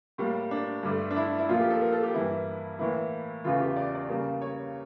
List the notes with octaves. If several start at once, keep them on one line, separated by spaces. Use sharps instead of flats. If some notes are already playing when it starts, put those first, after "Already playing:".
A2 G3 A#3
D4
G2 D3 A3
D4
E4
E4
A#2 F3 A#3 F4
G4
A4
A#4
A4
G4
G2 E3 A#3 E4
A2 E3 A#3 E4
E2 C#3 E3 A3 F4
G4
D5
D5
C#3 G3 A#3
C#5